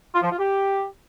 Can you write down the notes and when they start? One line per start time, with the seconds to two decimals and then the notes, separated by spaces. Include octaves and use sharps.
0.15 F4
0.23 F3
0.31 F4
0.39 G4